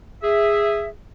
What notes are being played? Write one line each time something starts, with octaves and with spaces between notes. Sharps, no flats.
G#4 E5